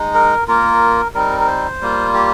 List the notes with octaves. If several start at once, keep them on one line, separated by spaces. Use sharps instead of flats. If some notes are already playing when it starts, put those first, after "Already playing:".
Already playing: G#3 D#4
A#4
A#3 F4 A#4
G3 C4 D#4 A#4
A#4
C5
G3 A#3 F4
G4